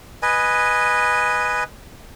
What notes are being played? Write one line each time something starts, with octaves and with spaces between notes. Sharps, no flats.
B4 D#5 G#5